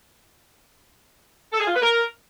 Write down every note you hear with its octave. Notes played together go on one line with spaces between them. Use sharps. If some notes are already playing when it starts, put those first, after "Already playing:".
A4
G#4
F4
B4
A#4